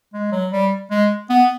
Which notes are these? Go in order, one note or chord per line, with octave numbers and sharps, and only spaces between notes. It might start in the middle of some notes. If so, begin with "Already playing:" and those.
G#3
F#3
G3
G#3
B3